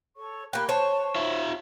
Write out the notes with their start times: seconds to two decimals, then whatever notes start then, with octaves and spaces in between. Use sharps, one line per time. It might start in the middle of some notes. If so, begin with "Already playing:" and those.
0.16 A4 C#5 C#6
0.53 A#3 G4 G5 B5 F#6
0.69 C5 C#5 A5 C#6
1.15 D#4 F4 F#4 E5